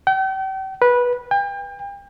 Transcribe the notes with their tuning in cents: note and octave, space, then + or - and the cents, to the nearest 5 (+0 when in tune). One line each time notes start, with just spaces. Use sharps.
G5 -40
B4 -15
G5 +35